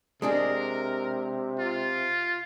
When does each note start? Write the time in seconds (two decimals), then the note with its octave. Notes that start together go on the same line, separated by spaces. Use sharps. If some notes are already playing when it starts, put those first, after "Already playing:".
0.22 C3 G#3 D4 G#4 A#4
1.59 F4